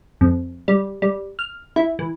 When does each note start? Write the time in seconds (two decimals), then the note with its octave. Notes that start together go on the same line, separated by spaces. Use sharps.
0.21 F2
0.68 G3
1.02 G3
1.39 F6
1.76 E4
1.99 E3